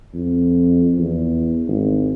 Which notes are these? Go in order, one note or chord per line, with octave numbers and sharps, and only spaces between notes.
F2
E2
G#1